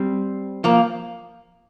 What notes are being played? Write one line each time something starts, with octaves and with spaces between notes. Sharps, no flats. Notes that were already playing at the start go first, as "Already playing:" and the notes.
Already playing: G3 C4
F3 A#3